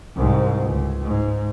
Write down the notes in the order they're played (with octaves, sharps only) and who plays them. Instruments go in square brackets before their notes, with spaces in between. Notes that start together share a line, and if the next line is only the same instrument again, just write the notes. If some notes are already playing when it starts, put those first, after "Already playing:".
[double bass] C2 G#2
C#2
G#2